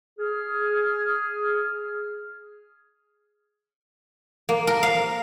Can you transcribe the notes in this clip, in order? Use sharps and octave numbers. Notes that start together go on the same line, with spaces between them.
G#4 F6
A#3
A#4
F5